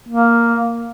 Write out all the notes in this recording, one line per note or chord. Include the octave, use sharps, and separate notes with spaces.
A#3